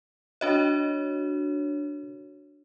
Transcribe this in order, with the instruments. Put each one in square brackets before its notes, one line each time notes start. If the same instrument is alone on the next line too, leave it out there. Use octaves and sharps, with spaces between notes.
[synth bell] D4 F#4 C#5 [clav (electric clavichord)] D#5